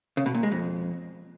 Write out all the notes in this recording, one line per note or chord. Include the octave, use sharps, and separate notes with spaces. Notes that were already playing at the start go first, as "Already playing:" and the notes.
C#3
B2
A#2
G#3
F2